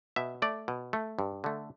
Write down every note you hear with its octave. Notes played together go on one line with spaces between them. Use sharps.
B2 E5
A3 D5
B2
A3
G2
D3 A3